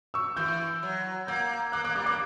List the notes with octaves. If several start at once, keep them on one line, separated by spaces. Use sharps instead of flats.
C#6 E6
E3 E6 G6
F#3
A#3 E6 G6
A#3 D6 F#6
A#3 D6 F#6
G3 D6 F#6
A#3 D6 F#6